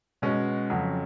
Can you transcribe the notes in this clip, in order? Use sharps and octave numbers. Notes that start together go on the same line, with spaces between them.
B2 G#3 C#4
F2 C#3 F#3